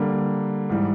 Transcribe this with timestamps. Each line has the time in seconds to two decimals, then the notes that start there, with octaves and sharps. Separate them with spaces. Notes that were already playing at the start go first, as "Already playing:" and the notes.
Already playing: D3 G3 A#3
0.70 G#2 E3 G3